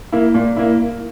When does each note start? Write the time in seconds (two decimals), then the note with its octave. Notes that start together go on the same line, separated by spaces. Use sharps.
0.12 A#3 E4
0.34 A#2
0.57 A#3 E4